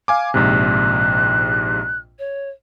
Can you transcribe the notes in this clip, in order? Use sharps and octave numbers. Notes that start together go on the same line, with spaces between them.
F5 G#5 D6
A#1 G#2 C3 F#6
C#5